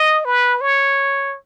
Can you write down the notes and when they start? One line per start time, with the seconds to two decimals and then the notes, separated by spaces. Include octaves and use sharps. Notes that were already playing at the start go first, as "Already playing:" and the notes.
Already playing: D#5
0.25 B4
0.61 C#5